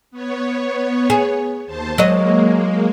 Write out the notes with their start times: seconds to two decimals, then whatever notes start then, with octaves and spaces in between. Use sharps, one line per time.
0.11 B3 C#5
1.10 G#4
1.66 D#2 C5 A5
1.98 F#3 G#3 A#3 D#5